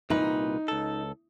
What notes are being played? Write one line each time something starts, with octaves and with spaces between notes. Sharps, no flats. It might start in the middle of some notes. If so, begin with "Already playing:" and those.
C2 A#2 D#4 B4
C#2 A4